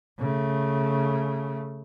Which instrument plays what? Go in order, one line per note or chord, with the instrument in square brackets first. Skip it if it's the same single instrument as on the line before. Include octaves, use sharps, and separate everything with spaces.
[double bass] C#3 A3